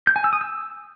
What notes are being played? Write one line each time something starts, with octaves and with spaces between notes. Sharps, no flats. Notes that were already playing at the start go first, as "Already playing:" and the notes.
G6
G#5
E6
D#6
E6